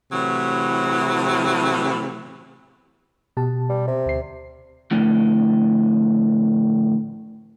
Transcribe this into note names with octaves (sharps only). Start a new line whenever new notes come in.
A2 C3 E3 F#3
B2 G4 A5
G3
C3
D2 C7
F2 A2 D3